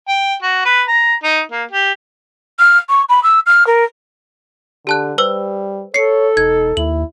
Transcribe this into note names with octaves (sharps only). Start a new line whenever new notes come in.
G5
F#4
B4
A#5
D#4
A#3
G4
F6
C#6
B5
E6
F6
A#4
D3 G4 A5 F#6
G3 B4 C5 E6
A4 C#5 C7 C#7
E1 D#4 G#6
D#2 E4 F#7